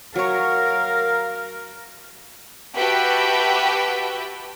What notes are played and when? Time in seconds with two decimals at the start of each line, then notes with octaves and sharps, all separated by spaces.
0.16 F#3 A#4 C#5 F5
2.77 F#4 G4 B4 E5 G5 A5